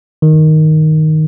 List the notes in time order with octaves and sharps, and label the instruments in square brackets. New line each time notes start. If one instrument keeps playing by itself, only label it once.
[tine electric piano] D#3